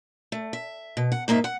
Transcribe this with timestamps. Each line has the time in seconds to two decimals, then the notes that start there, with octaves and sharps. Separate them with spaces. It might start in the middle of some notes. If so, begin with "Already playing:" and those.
0.32 A3
0.53 E5
0.97 B2
1.12 F#5
1.28 G#2 A#3 D#4 A#4 E5
1.44 F#5